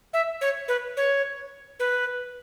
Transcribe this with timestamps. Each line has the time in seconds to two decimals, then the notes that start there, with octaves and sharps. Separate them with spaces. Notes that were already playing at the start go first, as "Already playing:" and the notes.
0.13 E5
0.41 C#5
0.68 B4
0.97 C#5
1.80 B4